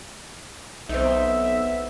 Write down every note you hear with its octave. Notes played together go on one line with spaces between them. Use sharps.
B1 B3 C4 D#4 E5